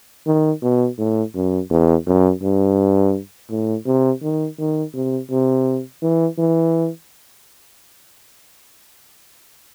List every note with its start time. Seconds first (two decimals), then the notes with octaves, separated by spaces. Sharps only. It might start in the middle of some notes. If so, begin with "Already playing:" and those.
0.27 D#3
0.63 B2
0.98 A2
1.35 F#2
1.70 E2
2.07 F#2
2.43 G2
3.51 A2
3.86 C3
4.23 D#3
4.58 D#3
4.95 C3
5.31 C3
6.02 E3
6.39 E3